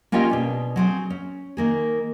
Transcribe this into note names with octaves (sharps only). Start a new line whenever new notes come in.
A#3 C#4 F4 G4 D#5 G5
B2 D4 G#4
F#3 C4 G#4
C#4
D#3 A#3 G#4